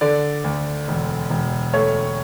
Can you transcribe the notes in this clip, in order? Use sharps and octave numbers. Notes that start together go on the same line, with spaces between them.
D3 D5
D2
E1
E1
A3 C#5